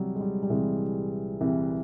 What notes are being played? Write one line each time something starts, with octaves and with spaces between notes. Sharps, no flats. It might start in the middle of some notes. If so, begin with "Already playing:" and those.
Already playing: C2 C3 E3 F#3 G3
G#3
G3
G3
C2 C3 E3 G#3
C2 C3 E3